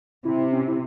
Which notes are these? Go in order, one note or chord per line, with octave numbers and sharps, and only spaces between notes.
C3 E4
C#4
E4